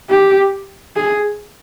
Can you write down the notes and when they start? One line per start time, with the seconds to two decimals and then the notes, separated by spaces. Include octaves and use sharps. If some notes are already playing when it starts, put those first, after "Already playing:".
0.10 G4
0.96 G#4